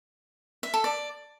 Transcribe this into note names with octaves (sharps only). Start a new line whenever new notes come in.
E5
A4
D5